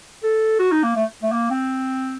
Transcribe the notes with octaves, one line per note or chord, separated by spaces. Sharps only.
A4
F#4
D#4
A#3
A3
A3
A#3
C4